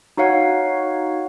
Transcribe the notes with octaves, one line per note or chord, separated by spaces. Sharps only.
D#4 F#4 C#5 F5 F#5